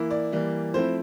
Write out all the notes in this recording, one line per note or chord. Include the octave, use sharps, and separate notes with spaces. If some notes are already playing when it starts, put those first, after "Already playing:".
Already playing: E3 A#3 E4
D5
E3 G3 A#3
F3 A3 C4 E4 C5